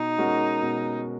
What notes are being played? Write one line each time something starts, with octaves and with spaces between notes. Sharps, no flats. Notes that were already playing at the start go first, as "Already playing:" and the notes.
Already playing: B2 D#4
G#3 C#4 F#4 A#4
B2